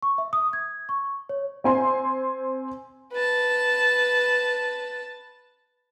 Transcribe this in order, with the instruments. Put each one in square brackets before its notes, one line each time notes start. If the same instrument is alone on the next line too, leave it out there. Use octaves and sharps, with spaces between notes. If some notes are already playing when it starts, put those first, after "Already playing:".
[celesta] C#6
E5
D#6
G#6
C#6
C#5
[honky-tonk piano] C4 G#5 C6
[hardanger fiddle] B4 A5